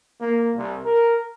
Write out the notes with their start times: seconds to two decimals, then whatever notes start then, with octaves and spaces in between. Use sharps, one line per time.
0.21 A#3
0.55 C2
0.84 A#4